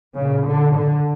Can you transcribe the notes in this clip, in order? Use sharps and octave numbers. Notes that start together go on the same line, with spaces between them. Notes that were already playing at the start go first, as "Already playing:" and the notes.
A#2 C#3
D3
D3